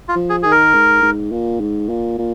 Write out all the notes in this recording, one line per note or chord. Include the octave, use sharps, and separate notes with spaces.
F4
F3
G#4
D#3 G#4
A#4
G#2
G#2
A#2
G#2
A#2
A#2